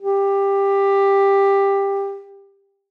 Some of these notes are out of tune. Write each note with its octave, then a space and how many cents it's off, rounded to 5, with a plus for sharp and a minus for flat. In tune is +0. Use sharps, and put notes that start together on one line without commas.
G4 +15